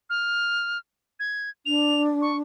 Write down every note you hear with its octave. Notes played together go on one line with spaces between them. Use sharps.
F6
G#6
D4 F7
C#6